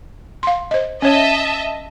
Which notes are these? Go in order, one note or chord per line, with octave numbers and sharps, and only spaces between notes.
F5 C6
C5 D#5
C#4 C#5 D#5 E5 A5